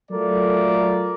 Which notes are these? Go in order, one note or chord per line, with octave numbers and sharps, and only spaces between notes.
F#3 A3 F4 A4 A#4 D5